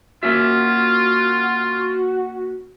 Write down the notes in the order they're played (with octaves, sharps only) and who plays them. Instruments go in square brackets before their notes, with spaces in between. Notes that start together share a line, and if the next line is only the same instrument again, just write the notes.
[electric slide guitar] A#3 C#4 E5 [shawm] F4 [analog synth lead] F#4